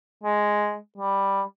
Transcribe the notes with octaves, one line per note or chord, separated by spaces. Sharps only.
G#3
G3